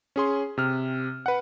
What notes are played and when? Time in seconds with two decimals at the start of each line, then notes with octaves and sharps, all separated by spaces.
0.16 C#4 G#4 C6
0.58 C3 F6
1.26 B4 F#5